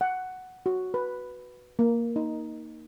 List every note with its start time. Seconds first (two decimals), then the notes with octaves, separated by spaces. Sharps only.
0.01 F#5
0.66 F#4
0.94 B4
1.79 A#3
2.16 D#4